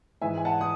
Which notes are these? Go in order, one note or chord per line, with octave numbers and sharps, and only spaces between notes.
G#2 E3 G#3 E5 G#5
G#5
F#5 A5
D#6